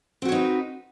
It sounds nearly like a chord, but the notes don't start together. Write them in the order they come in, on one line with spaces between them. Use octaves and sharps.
C4 F#4 C#5 D#4 B4